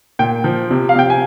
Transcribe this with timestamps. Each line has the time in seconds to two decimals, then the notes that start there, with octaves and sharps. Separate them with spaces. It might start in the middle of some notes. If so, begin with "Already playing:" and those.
0.19 A#2 G5
0.44 F3
0.71 C3
0.89 F5
0.96 C3 G5
1.10 G#5